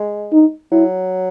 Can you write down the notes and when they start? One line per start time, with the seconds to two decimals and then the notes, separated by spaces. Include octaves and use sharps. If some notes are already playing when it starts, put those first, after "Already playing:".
Already playing: G#3
0.32 D#4
0.72 F#3 E4